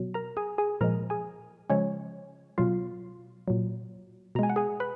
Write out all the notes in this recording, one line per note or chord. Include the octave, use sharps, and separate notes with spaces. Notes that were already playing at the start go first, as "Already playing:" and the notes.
Already playing: B2 F#3
A#4 A#5
G#4 G#5
G#4 G#5
A#2 F3 G#3 A#4 A#5
G#4 G#5
C#3 F3 G#3 C#4 C#5
B2 F#3 F4 F5
A#2 F#3
B2 G#3 G#5 A#5
F#5
G#4 G#5
B4 B5